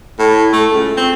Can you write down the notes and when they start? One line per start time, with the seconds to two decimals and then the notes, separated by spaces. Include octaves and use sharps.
0.19 A2
0.53 A3
0.72 C#2
0.97 C4